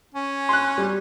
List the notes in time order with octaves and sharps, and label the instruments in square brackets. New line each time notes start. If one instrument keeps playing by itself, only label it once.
[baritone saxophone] C#4
[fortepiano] C6 F#6
G3